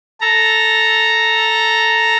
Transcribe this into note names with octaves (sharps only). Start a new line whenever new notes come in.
A4 A#5